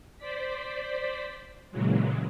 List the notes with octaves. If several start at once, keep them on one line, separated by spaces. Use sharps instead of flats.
C5 D5 B6
A#2 C#3 E3 F#3 G#3